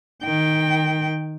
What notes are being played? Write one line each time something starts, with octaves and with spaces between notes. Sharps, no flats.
D#3 G5